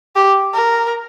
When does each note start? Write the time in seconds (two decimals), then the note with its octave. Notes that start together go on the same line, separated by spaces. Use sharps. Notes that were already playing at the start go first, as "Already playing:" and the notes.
0.16 G4
0.54 A#4